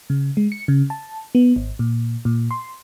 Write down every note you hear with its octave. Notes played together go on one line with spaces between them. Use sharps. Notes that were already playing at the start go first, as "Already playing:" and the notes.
C#3
G#3
C#7
C#3
A5
B3
G#1
A#2
A#2
C6